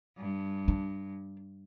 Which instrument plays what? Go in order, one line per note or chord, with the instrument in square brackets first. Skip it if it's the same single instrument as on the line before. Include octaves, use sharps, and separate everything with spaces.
[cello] G2
[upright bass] D4